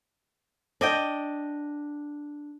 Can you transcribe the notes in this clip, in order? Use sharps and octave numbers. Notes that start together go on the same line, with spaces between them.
D4 D#5 G5